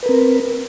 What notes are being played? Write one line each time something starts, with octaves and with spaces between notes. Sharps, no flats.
C4 A#4 B4